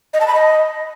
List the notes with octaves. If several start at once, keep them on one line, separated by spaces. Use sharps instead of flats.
D#5
A5
B5
D#5